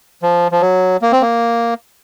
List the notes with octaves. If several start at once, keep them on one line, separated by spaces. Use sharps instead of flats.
F3
F3
F#3
A#3
C4
A#3